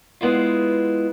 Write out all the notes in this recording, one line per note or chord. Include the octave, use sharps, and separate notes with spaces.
G#3 B3 E4 F4